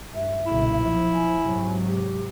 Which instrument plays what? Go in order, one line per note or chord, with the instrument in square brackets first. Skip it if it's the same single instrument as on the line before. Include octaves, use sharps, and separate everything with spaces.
[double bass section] G2 [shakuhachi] E5
[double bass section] B1 A#2 C#3 [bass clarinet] E4
[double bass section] F3
[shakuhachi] G#5
[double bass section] G#2 C3 F#3
[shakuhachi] G4